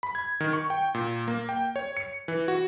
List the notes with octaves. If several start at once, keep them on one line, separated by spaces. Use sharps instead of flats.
B5
G#6
D#3
C#6
G5
A#2
A#3
G5
C#5
C#7
E3
F#4